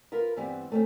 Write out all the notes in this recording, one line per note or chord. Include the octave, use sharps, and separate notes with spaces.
F4 A#4 B4
G2 E3 G3 B3 C4
A3 C4 C#4